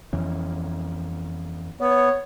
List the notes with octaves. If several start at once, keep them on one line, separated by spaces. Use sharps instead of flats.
F2 E3 C#4
B3 C#5